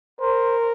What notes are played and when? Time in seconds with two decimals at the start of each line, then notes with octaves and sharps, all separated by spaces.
0.20 A#4 C5